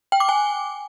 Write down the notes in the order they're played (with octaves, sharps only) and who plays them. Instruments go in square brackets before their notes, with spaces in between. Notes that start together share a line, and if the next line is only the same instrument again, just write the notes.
[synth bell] G5
D6
G#5